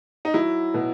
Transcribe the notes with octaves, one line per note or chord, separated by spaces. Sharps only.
D#4
F#3 E4
B2